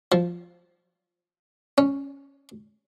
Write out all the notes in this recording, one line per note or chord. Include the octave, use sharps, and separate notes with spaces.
F3
C#4